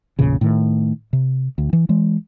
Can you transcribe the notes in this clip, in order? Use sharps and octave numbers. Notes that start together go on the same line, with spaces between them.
A1 E2 A#2 C#3
A2 D#3
C3
D2
E3
E3 G#3